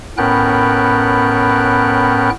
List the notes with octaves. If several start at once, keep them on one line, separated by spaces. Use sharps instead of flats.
A2 B3 C#4 A#4 G5 F#6